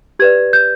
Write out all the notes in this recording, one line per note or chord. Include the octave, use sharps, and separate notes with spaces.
G4 B4 D5 G#6
G6